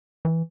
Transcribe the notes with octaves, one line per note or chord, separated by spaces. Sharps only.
E3